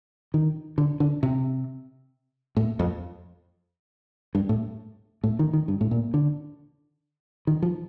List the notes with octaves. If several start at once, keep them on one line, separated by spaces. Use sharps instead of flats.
D#3
D3
D3
C3
A2
F2
G2
A2
A2
D#3
D#3
G2
A2
A#2
D3
D#3
F3